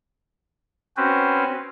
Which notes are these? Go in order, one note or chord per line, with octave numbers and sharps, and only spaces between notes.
C4 C#4 F#4 B4 C5